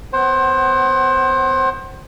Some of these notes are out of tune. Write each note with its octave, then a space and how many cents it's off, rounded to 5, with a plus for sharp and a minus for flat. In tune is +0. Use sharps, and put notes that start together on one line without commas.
B3 +30 C5 +25 F#5 +45